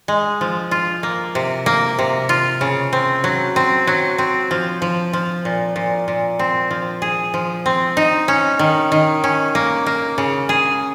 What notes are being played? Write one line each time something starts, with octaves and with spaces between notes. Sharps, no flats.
G#3
F3
F4
A#3
C3
A#3
C3
F4
C#3
C4
F#3
C4
F#3
C4
F3
F3
F3
A#2
A#2
A#2
C4
F3
G#4
F3
C4
D#4
C#4
D#3
D#3
C#4
A#3
A#3
C#3
G#4